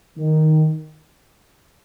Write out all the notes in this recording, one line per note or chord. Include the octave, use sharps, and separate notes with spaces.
D#3